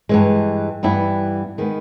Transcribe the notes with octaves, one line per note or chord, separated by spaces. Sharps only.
G2 E3 G#3
G2 E3 G3 B3 E4
D#3 G#3 B3